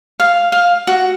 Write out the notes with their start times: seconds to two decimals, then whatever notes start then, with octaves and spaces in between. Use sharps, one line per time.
0.20 F5
0.52 F5
0.87 F#4